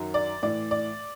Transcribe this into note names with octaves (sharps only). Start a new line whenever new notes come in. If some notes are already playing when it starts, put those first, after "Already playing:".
Already playing: F#2 D#3 F#3
D5
A2 E3 D5
D5